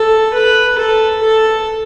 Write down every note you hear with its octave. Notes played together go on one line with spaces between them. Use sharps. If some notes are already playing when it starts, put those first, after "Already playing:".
Already playing: A4
B4
A4
A4